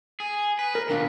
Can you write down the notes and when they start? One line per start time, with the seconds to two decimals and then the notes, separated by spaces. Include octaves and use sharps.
0.20 G#4
0.59 B4
0.75 A#4
0.89 B1 A#2 D#3 D4 F5